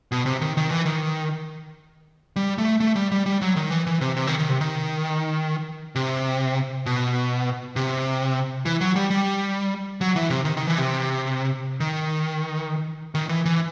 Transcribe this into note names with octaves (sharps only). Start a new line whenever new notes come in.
B2
C3
D#3
D#3
E3
D#3
G3
A3
A3
G3
G3
G3
F#3
D#3
E3
E3
C3
C3
D#3
D#3
C3
D#3
C3
B2
C3
E3
F#3
G3
G3
F#3
E3
C3
D#3
D#3
E3
C3
D#3
D#3
E3
E3